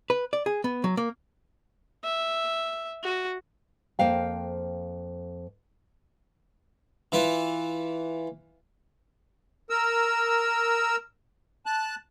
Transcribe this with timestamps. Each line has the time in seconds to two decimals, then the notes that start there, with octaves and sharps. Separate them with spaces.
0.10 B4
0.33 D5
0.46 G#4
0.64 B3
0.84 F#3
0.97 A#3
2.04 E5
3.03 F#4
3.99 F2 A#3 C5 F5 G5
7.12 E3 E4 F4
9.70 A#4 E6
11.66 A5 F#6